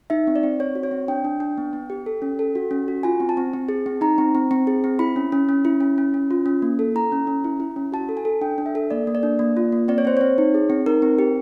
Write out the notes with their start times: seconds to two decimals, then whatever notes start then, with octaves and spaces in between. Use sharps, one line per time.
0.10 D#4 E5
0.27 C4
0.36 D5
0.43 C4
0.60 C4 C#5
0.75 F#4
0.83 C#5
0.91 C4
1.08 D4 G5
1.25 D4
1.40 D4
1.58 B3
1.73 B3
1.90 G4
2.06 A4
2.22 C#4
2.39 A4
2.55 F#4
2.71 C#4
2.88 F#4
3.03 F4 G#5
3.20 C4
3.29 A5
3.37 C4
3.53 C4
3.69 G#4
3.86 C4
4.01 D#4 A#5
4.18 C4
4.35 C4
4.51 C4
4.67 G#4
4.84 C4
4.99 E4 B5
5.16 C#4
5.32 C#4
5.49 C#4
5.65 E4
5.81 C#4
5.98 C#4
6.14 C#4
6.31 F4
6.46 C#4
6.62 A#3
6.79 A4
6.95 E4 A#5
7.12 C#4
7.27 C#4
7.44 E4
7.60 E4
7.76 C#4
7.92 F#4 A5
8.09 A4
8.17 G#5
8.25 A4
8.41 D4 G5
8.58 D4
8.66 E5
8.75 A4
8.91 A#3 D5
9.07 A#3
9.15 D5
9.23 D4
9.39 A#3
9.57 F4
9.72 A#3
9.88 C4 D5
9.98 C#5
10.05 C4 C5
10.17 C4 C#5
10.38 D#4
10.54 G#4
10.70 C4
10.86 D#4 A#4
11.02 C4
11.19 G4